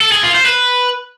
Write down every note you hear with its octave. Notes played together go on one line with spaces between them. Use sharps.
A4
G#4
F4
C5
B4